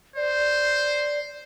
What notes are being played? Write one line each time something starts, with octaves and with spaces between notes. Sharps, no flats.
C5 D5